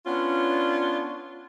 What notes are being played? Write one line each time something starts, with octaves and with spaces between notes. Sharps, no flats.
B3 C#4 D4 F4